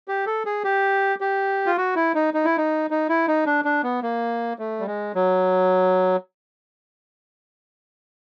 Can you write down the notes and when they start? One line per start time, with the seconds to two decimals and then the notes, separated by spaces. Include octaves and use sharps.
0.08 G4
0.26 A4
0.46 G#4
0.64 G4
1.21 G4
1.66 F4
1.78 F#4
1.95 E4
2.15 D#4
2.34 D#4
2.45 E4
2.57 D#4
2.90 D#4
3.09 E4
3.28 D#4
3.46 D4
3.65 D4
3.83 B3
4.03 A#3
4.59 A3
4.80 G3
4.87 G#3
5.15 F#3